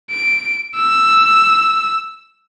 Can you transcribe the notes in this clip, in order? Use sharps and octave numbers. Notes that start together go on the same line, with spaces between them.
D7
E6